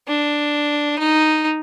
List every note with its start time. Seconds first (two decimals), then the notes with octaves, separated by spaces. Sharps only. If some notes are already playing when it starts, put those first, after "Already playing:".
0.08 D4
0.99 D#4